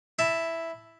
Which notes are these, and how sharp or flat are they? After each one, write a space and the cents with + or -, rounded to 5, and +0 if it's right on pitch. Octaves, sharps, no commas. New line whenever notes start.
E4 +0 A5 +0